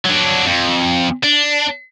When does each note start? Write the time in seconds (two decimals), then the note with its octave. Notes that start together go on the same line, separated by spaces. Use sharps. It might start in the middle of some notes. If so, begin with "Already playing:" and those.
0.06 F#3 D4
0.46 F2
1.23 D4